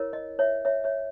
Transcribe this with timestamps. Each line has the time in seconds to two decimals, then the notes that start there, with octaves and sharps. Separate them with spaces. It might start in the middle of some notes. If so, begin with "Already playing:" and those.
Already playing: E4 A#4 C#5
0.13 D#5
0.39 C#5 E5
0.65 C#5 E5
0.84 C#5 E5